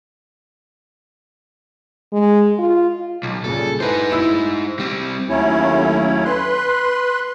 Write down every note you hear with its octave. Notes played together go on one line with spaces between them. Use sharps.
G#3
F4
B1
G2 A#2 C#3 A4
D#4 E4 B4 C5 G#5
E4 E6
G3 C4
D#2 F#3 A3 C#4 E4 C#5
B4 C6 F#6